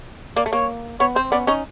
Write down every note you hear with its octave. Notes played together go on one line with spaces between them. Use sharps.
A#3 D5
A3
A#3 C#5
B3 C#5
C4 C5
B3 C#4 D5
C#4 D#4 C#5